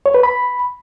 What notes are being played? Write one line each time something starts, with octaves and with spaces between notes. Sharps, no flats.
C#5
B4
B5